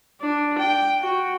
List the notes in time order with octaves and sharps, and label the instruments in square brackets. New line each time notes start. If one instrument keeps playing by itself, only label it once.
[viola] D4
G5
F#4